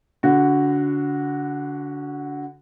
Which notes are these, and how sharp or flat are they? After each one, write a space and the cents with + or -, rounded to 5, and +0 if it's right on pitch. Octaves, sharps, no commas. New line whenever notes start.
D3 -30 F#4 +0